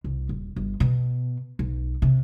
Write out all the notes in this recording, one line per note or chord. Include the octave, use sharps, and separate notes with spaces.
C2
D#1
G1
B2
B1
C3